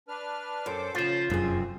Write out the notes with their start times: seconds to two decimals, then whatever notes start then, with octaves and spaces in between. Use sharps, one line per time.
0.08 D4 B4 F6
0.66 F#2 A4 C5 D6
0.95 C#3 F3 F4 C5 G6
1.30 F1 F#2 F3 C4 G#4